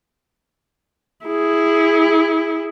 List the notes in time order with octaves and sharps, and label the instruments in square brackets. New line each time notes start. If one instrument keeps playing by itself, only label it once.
[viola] E4 G#4